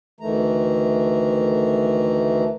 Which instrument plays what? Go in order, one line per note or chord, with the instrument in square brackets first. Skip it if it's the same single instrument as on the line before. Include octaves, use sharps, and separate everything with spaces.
[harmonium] D2 D#3 E3 A3 A#5